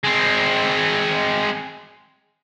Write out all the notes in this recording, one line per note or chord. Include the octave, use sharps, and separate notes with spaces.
G#3 C4